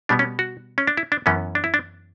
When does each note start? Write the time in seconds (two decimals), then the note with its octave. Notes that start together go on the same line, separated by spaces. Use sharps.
0.09 B2 G3 B3 D4
0.19 C#4
0.39 F#4
0.78 C#4
0.87 D4
0.97 E4
1.12 D4
1.26 F#2 E3 B3 C#4
1.55 D4
1.64 E4
1.74 D4